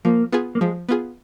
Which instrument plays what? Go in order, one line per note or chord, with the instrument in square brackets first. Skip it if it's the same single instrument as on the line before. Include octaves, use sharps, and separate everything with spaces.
[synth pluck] F3 [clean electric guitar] A#3
[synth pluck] B3 F4 G#4
[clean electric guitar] A#3
[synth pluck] F3 [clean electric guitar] G#3
[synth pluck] B3 F4 G#4